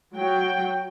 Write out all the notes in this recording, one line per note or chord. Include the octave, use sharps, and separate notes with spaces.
F#3 F#4 G5